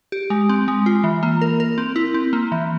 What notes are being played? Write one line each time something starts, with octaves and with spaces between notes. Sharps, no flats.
G4
G#3
C4
G#3
F4
E3
A#3
A#4
A#4
C4
E4
C4
A#3
E3